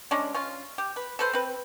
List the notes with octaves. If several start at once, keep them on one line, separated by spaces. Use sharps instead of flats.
G#3 C#4 D4
C#4 F4
G4
B4
A4 B4 C5
C4 B4